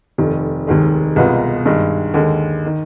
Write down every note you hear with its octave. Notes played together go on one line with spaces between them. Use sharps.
F1 F2 D#3
F1 D#2 D#3 G#3
C2 B2 G#3 B3 F4
G2 D#3 G#3
D#2 D3 G#3
D#3